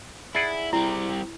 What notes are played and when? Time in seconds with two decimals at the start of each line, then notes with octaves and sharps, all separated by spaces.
0.35 E4 G#4 D5 F#5
0.73 G3 C4 E4